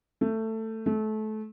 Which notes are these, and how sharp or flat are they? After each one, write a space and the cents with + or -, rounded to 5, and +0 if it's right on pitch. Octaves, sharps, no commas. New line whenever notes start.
A3 +15
A3 -25